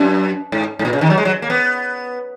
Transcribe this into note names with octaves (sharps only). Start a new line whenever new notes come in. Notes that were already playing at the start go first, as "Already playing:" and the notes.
Already playing: F#2
G#2
G#2
A#2
C#3
D#3
F#3
G#3
F#3
A#3
B3